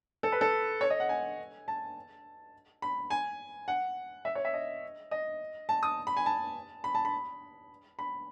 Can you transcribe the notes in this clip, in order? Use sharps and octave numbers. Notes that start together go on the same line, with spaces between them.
A4
B4
A4
C#5
D#5
F#5
G#5
A5
B5
G#5
F#5
E5
C#5
E5
D#5
D#5
A5
D#6
B5
G#5
A5
B5
A5
B5
B5